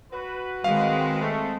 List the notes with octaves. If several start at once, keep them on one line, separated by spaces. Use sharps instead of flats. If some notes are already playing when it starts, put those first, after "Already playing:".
F#4 B4
D#3 G#3 C4 F5
A3